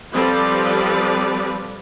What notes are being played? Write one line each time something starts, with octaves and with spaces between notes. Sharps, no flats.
F3 G3 C4 A4 B4 D5